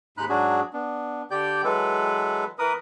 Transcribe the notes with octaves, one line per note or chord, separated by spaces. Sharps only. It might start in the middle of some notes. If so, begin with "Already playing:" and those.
D#2 G#2 G#3 D#4 B5 F#6
G#2 F#3 D4 F#4 G#4
B3 D4
D3 G4 D5 G5 G6
E3 F#3 G#3 A4 B4
E3 A#4 B4 D#6